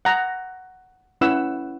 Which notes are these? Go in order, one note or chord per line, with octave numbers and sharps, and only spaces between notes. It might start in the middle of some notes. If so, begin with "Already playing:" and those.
F#5 A#5
C#4 E4 B4 F#5 E6